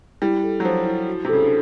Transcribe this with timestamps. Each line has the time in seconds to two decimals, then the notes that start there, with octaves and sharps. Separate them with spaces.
0.22 G3 E4
0.44 A4
0.60 F#3
0.65 F3 C5
0.86 E4
1.08 F#4
1.25 C3
1.29 C#3 A4
1.42 D3